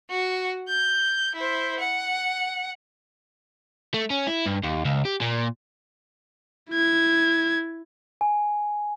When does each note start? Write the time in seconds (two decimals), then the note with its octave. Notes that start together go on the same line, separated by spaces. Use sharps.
0.10 F#4
0.68 G6
1.35 E4 C5
1.80 F#5
3.94 A3
4.10 C#4
4.27 E4
4.46 G2
4.63 D#2
4.85 C#2
5.05 G4
5.21 A#2
6.70 E4 G#6
8.21 G#5